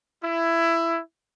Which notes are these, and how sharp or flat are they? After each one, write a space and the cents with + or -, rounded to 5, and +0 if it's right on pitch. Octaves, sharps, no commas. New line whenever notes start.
E4 +15